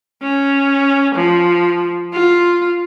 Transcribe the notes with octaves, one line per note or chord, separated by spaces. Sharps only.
C#4
F3
F4